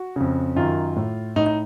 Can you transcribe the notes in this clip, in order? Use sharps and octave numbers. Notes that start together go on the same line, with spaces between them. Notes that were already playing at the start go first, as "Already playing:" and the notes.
Already playing: F#4
F2 C#3
F#2 D#3 F4
A2
A2 D#4
D#4